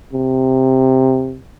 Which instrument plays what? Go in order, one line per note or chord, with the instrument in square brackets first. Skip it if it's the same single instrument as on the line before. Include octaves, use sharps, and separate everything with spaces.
[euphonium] C3